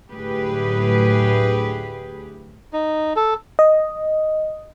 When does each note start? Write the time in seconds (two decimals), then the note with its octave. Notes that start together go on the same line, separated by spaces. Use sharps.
0.11 D2 A2 F#3 G4 G#4 B4
2.73 D#4
3.16 A4
3.59 D#5